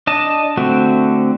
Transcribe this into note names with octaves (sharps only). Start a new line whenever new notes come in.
D4 D#5 A5
D3 A3 C4 F#4